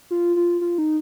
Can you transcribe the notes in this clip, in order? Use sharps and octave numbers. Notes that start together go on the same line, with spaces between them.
F4
F4
F4
D#4